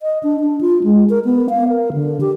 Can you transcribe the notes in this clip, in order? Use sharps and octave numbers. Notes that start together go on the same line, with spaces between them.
D#5
D4
D4
F4
G#3
A#4
B3
F5
A#4
D3
G4